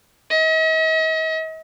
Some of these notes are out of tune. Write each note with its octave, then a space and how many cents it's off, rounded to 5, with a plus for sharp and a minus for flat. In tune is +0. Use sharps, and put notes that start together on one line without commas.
D#5 +45